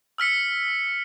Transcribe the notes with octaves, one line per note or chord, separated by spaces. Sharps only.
E6 F6 B6 C#7